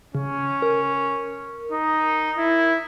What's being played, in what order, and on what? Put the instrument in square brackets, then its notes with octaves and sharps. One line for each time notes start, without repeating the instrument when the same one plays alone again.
[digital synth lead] C#3 [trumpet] C#4
[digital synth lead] A#4
[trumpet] D#4
E4